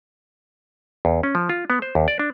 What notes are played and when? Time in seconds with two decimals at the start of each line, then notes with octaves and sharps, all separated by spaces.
1.05 E2
1.23 C#4
1.35 F3
1.49 F4
1.70 B3
1.82 C5
1.95 D#2
2.08 D5
2.19 D4